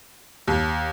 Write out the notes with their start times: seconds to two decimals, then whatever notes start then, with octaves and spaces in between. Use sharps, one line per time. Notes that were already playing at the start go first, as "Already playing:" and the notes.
0.48 D#2